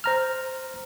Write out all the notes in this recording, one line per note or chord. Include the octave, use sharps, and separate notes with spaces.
C5 A#5 F6